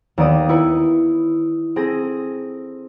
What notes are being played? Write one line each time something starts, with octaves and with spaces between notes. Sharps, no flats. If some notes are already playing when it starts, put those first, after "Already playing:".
D#2 B3 D5 D#6
E4 B4 B5 C#7
C4 G#4 A4 A#6 D#7